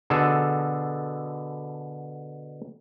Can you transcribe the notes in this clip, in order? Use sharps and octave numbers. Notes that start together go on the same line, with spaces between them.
B2 D3 G#4 A4